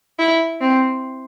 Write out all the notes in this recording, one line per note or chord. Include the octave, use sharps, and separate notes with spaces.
E4
C4